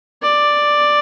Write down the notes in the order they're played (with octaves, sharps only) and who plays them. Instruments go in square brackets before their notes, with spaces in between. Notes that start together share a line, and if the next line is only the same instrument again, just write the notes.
[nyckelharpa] D5